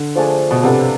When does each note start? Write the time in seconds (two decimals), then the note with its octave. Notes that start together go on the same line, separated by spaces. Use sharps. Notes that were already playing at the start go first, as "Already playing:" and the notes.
Already playing: D3
0.15 F3 A3 D4 G#4
0.51 B2
0.62 C3 F3 B3 D4 A4